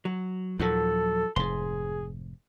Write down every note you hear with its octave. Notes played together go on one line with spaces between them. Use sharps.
F#3
D#2 A#2 F3 F#3 A4
F1 G#2 G#4 C6